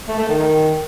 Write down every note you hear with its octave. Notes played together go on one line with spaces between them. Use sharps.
A3
A3
D#3